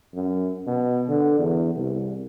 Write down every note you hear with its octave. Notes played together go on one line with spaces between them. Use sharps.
F#2
B2
D3
E2
C2